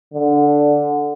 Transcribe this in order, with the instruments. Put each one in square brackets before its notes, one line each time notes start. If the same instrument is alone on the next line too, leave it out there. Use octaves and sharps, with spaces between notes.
[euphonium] D3